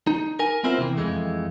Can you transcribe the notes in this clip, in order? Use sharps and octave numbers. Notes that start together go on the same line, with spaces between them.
D#4
A#4 G#5
B3 C4 E4 F4 A#4 C5
C3 E3
F2 G#2 E3 G#3 A3